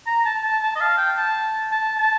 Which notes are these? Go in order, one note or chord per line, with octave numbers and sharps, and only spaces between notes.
A#5
A5
A5
A5
D#5
F5
G5
A5
A5
A5